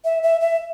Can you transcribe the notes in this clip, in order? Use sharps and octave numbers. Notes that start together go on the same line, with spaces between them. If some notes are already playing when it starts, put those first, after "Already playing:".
E5
E5
E5